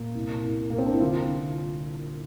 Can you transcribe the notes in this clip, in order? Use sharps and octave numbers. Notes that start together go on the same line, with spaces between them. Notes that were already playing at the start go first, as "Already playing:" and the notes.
Already playing: A#2 A#3
C2
C2
C2 A#3
C4
D4
E4
D3 F4
F4